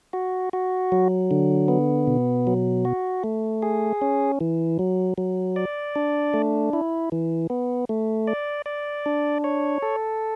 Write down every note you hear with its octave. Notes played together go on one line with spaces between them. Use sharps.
F#4
F#4
F#3
D3
B3
B2
F#3
F#4
A3
G#4
C#4
E3
F#3
F#3
D5
D4
A3
E4
E3
B3
A3
D5
D5
D4
C#5
A4